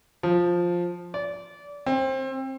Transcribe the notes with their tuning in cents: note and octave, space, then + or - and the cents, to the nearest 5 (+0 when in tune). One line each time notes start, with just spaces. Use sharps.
F3 +5
D5 -25
C4 +25